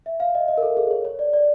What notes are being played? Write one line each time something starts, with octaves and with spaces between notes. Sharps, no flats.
E5
F5
D#5
D#5
A#4
A4
G#4
C#5
C#5
D5
D5